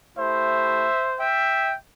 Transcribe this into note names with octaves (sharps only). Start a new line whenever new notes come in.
A3 E4 G4 C5 E5
E5 G5